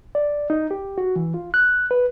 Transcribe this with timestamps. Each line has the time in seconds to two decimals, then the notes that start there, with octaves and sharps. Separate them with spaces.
0.15 D5
0.50 D#4
0.71 G4
0.98 F#4
1.16 E3
1.34 F4
1.54 F#6
1.91 B4